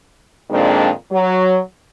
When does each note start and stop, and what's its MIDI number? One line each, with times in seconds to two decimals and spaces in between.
0.50 0.90 41
0.50 0.90 46
0.50 0.90 51
0.50 0.90 56
0.50 0.90 60
0.50 0.90 62
1.12 1.60 54